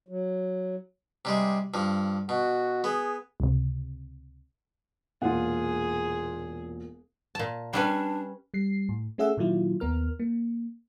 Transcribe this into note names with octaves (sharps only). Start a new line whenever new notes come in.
F#3
C3 G3 G#3
G2 F3
B2 F#4
B3 G#4
C#2 C3
E1 A#2 F4 G#4 F#5
A#2 A5
G3 C#4 D4 B4
G3 C7
A2
A3 C#4 G#4 E5 F#5 E6
A#2 D#3 F#3 E4 F4
D#2 B3 A#4 F6
A#3